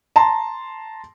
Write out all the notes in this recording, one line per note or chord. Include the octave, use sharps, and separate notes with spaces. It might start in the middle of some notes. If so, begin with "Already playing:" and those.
A5 A#5 C6